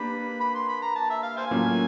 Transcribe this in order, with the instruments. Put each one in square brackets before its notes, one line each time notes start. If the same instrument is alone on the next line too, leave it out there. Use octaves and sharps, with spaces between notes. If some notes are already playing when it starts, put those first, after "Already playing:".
Already playing: [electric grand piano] A#3 D4 G4 B4 [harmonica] B5
[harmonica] B5
C6
B5
A#5
A5
E5
F5
C5 F5 G#5
[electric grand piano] A2 F#3 A#3 C#4 F4